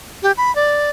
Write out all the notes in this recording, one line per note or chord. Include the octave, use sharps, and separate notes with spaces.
G4
B5
D5